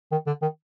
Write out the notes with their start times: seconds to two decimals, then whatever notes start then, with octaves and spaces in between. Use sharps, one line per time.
0.12 D#3
0.27 D3
0.42 D#3